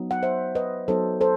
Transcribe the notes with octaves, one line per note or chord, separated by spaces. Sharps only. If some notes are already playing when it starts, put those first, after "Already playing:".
Already playing: F#3 B3 D#4
F#5
C5 E5
B4 D#5
F#3 B3 D#4 A4 C5
A4 C5